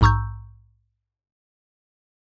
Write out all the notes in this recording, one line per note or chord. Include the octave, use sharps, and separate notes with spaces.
A#1 G#2 A#5 C#6 E6 G6